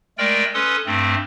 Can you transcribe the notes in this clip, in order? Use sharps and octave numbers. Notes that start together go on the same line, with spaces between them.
G#3 A3 A#4 D5 G5
C#4 A4 B4 C6 D#6
G2 A3 C4